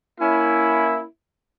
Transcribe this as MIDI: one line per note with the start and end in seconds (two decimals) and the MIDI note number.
0.20 1.04 58
0.20 1.04 61
0.20 1.04 64